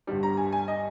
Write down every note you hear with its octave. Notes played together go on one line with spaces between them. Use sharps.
G1 G2 G3
A#5
G#5
G#5
D#5